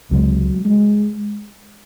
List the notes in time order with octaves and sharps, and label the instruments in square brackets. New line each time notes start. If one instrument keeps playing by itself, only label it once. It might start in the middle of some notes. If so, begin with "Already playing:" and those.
[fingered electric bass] C#2 C3 F3 G#3 [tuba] F#3
[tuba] G#3